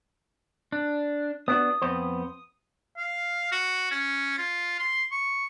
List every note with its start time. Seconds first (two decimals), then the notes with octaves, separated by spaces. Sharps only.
0.72 D4
1.48 B3 D4 F#4 D#6
1.82 F2 B3 C5
2.97 F5
3.52 F#4
3.91 C#4
4.38 F4
4.79 C6
5.12 C#6